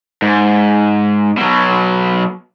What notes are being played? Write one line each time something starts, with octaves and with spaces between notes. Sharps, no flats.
G#2
B2 F#3